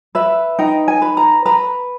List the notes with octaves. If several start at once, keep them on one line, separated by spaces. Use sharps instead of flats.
B4 E5
D#4 G5
G#5
B4
A#5
B4 A#5